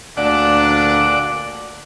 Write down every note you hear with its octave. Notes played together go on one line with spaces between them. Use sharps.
D2 A#2 D4 D5 F#5